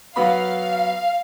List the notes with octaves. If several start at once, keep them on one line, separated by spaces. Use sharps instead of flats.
F#3 B3 F5 B5